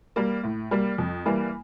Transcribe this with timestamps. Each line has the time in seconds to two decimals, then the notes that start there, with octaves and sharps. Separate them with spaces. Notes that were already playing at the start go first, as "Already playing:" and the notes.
0.16 G3 A#3
0.44 A2
0.71 G3 A#3
0.98 F2
1.26 E3 G3 A#3